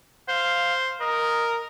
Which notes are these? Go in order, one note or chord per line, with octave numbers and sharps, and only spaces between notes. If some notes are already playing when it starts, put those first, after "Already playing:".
C5 F5
A#4 D#5